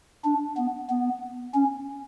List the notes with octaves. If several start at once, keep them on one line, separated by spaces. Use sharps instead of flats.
D4
B3
B3
C#4